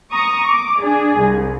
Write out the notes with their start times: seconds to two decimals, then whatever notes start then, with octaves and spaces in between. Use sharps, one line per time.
0.11 A#5 C#6 D#6
0.48 D6
0.80 D4 G#4
1.19 C2